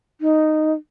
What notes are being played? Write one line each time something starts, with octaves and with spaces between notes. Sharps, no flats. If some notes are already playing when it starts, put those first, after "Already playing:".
D#4